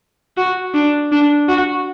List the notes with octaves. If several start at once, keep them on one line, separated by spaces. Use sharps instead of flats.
F#4
D4
D4
F#4